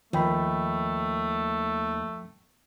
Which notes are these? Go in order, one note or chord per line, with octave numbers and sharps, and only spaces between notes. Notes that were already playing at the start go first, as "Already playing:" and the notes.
D#2 F3 A3 G5 B5